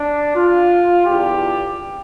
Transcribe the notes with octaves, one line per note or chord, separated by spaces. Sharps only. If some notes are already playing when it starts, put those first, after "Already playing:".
Already playing: D4
F4
E2 D3 G4